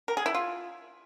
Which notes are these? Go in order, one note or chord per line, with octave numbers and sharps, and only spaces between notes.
A#4
G#4
E4
F4